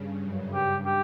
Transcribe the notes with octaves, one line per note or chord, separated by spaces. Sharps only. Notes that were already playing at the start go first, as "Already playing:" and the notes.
Already playing: G2 C#3
F#2
G2 G4
G4